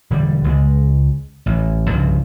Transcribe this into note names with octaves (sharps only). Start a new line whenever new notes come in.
E1 D3 G3
C#2 F#3 G#3
A1
C2 G2 C#3 F3